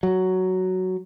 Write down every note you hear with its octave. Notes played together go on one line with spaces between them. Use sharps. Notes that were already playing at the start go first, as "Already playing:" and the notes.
F#3